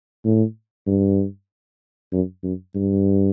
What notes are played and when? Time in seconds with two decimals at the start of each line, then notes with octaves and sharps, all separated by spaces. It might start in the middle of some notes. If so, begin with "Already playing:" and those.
0.25 A2
0.87 G2
2.12 F#2
2.43 F#2
2.75 G2